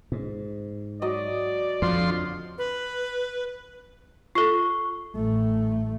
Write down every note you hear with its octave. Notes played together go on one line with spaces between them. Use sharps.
G#2
F#3 D5 D#5
F2 D3 F3 C6
B4
F4 A4 C#6
A1 A3